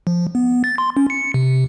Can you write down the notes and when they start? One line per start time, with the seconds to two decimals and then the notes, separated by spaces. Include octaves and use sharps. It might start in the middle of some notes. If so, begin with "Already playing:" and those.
0.07 F3
0.35 B3
0.64 A6
0.78 C6
0.97 C#4
1.10 C#7
1.34 C3